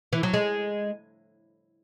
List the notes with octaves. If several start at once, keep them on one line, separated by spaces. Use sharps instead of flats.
E3
F#3
G#3